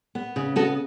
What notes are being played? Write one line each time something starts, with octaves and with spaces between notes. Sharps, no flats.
B3
C#3
B3 F#4 A4